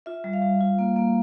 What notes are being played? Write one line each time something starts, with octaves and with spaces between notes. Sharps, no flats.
F4 E5
G3
F5
G3
F4
A#3
A#3